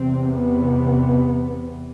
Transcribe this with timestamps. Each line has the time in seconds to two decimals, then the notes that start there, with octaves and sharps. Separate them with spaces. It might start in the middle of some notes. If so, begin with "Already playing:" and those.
Already playing: E2 C3 C4
0.35 B3